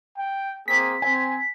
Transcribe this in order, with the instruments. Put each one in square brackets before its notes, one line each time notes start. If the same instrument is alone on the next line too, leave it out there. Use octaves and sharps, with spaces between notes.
[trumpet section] G5
[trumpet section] A#3 C4 G#4 [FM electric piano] B6
[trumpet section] C4 [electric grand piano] G#5